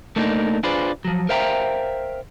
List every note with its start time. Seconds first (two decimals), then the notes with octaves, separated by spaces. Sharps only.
0.16 A3 A#3 D4 D#4
0.63 D4 F4 G#4 B4 C5 D5
1.05 F3 F#3
1.29 A#4 C5 E5 F5 G5 A#5